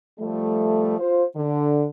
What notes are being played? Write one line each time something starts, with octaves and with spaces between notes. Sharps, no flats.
F3 G3 A3
F4 C5
D3